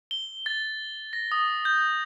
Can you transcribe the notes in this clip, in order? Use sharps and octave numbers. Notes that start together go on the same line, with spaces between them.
G7
A6
A#6
D#6
G6